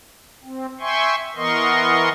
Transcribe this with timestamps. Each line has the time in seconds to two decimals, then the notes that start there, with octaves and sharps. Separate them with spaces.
0.43 C4
0.80 E5 G5 G#5 C6 C#6
1.36 E3 B3 A#4 D#5 C6 C#6